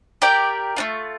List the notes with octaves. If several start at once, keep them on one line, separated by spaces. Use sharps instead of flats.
G4 A#4 D5 G5
A3 D4 F4